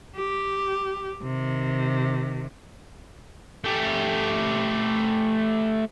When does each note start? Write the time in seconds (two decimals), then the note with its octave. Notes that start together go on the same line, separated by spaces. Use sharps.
0.17 G4
1.23 C3 D#3
3.64 A3 G4